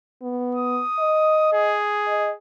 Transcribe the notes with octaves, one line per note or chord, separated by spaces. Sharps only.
B3
D#6
D#5
G#4
D#5